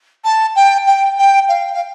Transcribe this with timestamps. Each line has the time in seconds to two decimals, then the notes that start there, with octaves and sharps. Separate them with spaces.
0.24 A5
0.55 G5
0.87 G5
1.18 G5
1.48 F5
1.73 F5